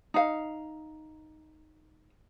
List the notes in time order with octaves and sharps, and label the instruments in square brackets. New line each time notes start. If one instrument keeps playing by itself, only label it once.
[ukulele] D#4 F5